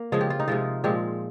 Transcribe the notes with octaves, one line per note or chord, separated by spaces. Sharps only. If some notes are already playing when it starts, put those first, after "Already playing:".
Already playing: A#3
C#3 F3 G#3 F4
G4
F4
D#4
C3 F3 G#3 F4
A#2 F3 G#3 G4